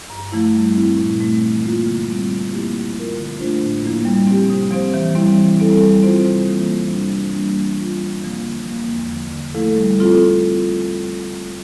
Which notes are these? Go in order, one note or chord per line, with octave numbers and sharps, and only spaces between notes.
G2
F3 A3 E4
G3
C4 E4
A#2
A3 C4
E3
A#3 F4
D3
G3 C4
F3
A#3 E4 G4
F3
C4 F4 A#4
D3
A3 D4 F4 C5
A2
F3 A#3 E4
G3
C4 G4
C3
F3 C4 G4 C5
E3
G3 C4 E4
E3
G3 C4 E4 A4
G3
C4 F4 C5
C3
E3 A#3
F2
C3 E3 G3 D4
C3
G3 A#3 D4
E3
G3 C4 F4
F2
C3 F3 A#3
D3
F3 A#3
E2
D3 F3
D3
F3 A3 E4 A4
G3
C4 F4 A4